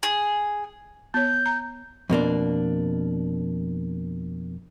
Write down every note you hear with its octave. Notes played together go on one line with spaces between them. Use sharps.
G#4
B3 C#5 G6
A#5
F2 B2 A#3 D4